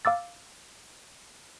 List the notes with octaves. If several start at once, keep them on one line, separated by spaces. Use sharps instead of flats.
F5 D6 E6 A6